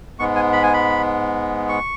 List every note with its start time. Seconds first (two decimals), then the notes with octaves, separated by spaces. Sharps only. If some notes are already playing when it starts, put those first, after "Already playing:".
0.19 G#2 G#3 B3 C#6
0.36 G#5
0.52 B5
0.63 G#5
0.73 B5
1.69 C#6